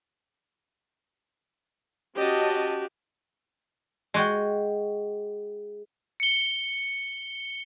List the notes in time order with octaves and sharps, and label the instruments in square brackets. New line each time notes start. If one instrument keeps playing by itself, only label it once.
[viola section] C#4 D#5 A5 [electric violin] F#4 G4
[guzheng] G#3 F#4 G5
[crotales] C#7 G7